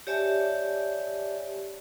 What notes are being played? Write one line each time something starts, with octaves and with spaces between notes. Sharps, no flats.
G4 C#5 D5 E5 G#5 A5